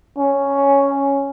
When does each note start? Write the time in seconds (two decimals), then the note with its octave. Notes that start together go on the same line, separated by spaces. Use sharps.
0.18 C#4